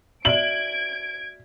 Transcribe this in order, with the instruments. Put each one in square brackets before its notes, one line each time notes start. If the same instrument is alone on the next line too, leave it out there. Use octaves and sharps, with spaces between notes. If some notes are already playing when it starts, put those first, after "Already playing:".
[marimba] F#4 D5 E5 [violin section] G#6 D7 [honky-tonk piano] F#7